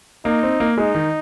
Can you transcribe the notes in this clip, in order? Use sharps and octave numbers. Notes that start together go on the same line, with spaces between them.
A#3 D#4
C4
A#3
G#3 D#4
D#3